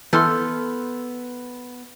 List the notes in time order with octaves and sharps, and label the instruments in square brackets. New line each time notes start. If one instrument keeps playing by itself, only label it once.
[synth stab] E3 [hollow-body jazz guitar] B3 F#5 [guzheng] A4 [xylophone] C6 F6 G6